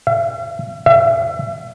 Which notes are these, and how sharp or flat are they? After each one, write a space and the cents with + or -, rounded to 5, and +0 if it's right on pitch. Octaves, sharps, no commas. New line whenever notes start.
E5 +45
E5 +30